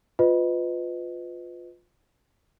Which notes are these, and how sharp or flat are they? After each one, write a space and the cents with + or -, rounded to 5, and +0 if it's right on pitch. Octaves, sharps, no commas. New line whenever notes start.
F4 +15 B4 +30 D#5 +0